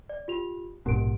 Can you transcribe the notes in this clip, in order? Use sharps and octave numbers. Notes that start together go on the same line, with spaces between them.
D5
F4 G4 F7
A#1 G#2 B2 G4 A#4 D7